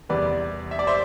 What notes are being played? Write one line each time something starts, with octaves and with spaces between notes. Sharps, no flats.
E2 C3 G3 B4 D5
E5
D5
C5 E5